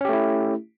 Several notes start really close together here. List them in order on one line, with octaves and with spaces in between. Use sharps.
C#4 G4 A3 E4